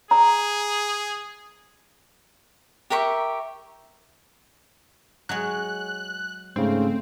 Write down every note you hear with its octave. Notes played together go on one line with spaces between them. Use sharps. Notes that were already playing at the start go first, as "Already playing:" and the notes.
G#4 A#5
G4 A#4 E5 C#6
F#3 G#3 C#5 F#6
G#2 C#3 A3 C4